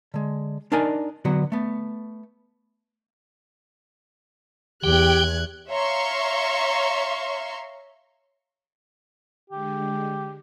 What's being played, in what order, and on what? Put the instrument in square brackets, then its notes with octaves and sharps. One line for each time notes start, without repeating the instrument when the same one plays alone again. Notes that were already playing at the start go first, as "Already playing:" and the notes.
[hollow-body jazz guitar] D3 G#3
D4 D#4 A#4 D5 G#5
D3 F#3 B3 F#4
A3 B3
[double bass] E2 [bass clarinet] G4 [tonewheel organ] G5 [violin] F#6 G#6
[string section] C#5 E5 F5 A#5 C6 C#6
[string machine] D3 G#3 [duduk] G4